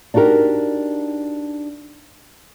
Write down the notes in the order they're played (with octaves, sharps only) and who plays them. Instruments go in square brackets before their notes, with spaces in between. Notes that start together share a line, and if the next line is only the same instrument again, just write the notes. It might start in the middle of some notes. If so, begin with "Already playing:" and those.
[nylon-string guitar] D4 D#4 F#4 G4 A#4